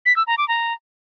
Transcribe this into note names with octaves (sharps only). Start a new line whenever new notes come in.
B6
E6
A#5
D6
A#5